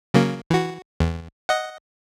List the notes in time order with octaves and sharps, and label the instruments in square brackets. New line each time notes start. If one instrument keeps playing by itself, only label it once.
[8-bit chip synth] C#3 F#3 A#3
E3 F#4
E2
D#5 F#5